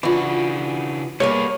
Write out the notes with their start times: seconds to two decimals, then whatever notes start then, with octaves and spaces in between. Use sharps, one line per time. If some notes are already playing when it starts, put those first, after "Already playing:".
0.03 C#3 E3 D4 F4 F#4 B5
1.20 G3 A3 A#3 G#4 B4 C#5